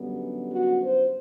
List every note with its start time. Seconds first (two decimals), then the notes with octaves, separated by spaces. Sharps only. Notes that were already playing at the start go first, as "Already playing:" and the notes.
Already playing: F#2 D3 G3 B3
0.52 F#4
0.80 C5